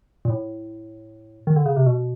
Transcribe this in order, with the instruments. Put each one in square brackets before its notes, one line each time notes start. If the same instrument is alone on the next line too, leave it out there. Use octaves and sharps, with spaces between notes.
[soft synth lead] A#2
A2
D#3
D3
C#3
C3
B2